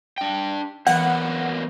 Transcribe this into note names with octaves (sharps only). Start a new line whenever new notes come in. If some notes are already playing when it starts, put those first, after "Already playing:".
D4 G5
E3 F#3 A#3 B3 F#5